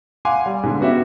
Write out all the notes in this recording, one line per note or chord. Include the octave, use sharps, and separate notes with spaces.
F5 F#5 G#5 C6 D6
G3
G#2 D3
B3 C#4 F#4 G4 E5